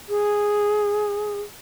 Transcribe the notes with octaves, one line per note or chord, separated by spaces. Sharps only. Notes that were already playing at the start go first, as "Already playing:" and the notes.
G#4